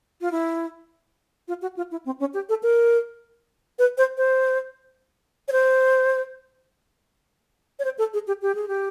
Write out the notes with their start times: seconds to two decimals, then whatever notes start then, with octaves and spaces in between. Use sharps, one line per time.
0.21 F4
0.32 E4
1.48 F4
1.62 F#4
1.77 F4
1.91 E4
2.06 C4
2.20 C#4
2.34 G4
2.49 A4
2.63 A#4
3.79 B4
3.98 C5
4.18 C5
5.48 C#5
5.52 C5
7.79 C#5
7.85 C5
7.98 A4
8.14 G#4
8.27 G4
8.42 G4
8.55 G#4
8.68 G4